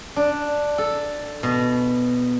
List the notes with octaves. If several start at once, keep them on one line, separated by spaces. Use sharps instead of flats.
D4
A4
B2